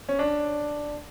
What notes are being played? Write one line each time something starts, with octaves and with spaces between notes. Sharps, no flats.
C#4
D4